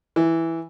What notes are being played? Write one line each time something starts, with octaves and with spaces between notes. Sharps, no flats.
E3